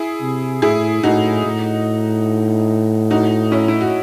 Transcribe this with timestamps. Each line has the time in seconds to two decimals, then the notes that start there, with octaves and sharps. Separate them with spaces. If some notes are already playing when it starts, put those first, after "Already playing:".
Already playing: E4 G#4
0.21 C3
0.62 A2 E4 G#4
1.03 A2 D#4 F#4
1.45 A2
3.11 D#4 F#4
3.52 C#4 E4
3.68 E4
3.81 F#4